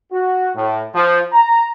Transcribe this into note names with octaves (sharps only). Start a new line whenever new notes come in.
F#4
A2
F3
A#5